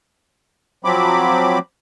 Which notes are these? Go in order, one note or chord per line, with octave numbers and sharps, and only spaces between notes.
F3 F#3 C4 B5 D6